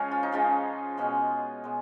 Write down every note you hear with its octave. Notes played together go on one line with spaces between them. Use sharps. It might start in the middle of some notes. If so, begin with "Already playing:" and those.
Already playing: C#3 F3 G#3 C#4 G#4
F4
D#4
C#3 F3 G#3 C#4 F4
B2 G#3 C#4 F4
B2 G#3